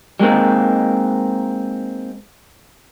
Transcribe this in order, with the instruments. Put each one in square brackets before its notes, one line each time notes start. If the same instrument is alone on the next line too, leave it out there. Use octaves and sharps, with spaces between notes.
[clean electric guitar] G3 G#3 A#3 C4 D#4